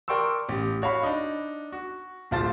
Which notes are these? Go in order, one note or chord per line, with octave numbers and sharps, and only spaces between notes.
A#4 D5 G5 C6 C#6 E6
A1 G4
F#4 C#5 F5 B5
D4 D#4
F#4
D1 A#1 F4 C5 A5 A6